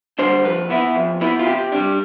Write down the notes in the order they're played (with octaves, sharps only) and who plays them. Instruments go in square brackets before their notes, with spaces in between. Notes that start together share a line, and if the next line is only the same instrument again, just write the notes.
[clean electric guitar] D3 G3 D4 C5
F2 B4
E3 B3 E4
F2
E3 B3 E4
F4
C3 G4
G3 D4